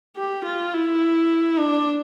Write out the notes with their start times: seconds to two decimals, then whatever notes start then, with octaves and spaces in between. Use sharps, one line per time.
0.17 G4
0.45 F4
0.74 E4
1.59 D4